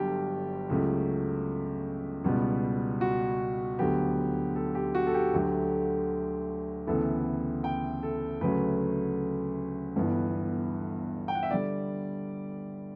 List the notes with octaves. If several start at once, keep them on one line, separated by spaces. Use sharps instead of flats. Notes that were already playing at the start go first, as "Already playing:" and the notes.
Already playing: G1 G2 D3 F#3 G4
C#2 C#3 F#3 A3
C#2 B2 G3 B3
F#4
D2 D3 F#3 B3 G4
A4
G4
F#4
A4
G4
D2 D3 F#3 A3
D2 C#3 E3 B3 A4
G5
A4
D2 C#3 F#3 A3 B4
G1 G2 E3 B3
G5
F#5
E5
D3 G3 D5